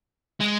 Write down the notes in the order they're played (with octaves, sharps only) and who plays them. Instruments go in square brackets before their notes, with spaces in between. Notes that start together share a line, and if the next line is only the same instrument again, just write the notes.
[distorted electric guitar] G#3